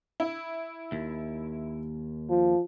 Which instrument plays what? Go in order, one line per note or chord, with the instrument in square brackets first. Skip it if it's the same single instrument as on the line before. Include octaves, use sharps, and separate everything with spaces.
[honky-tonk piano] E4
[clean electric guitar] D#2
[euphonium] F3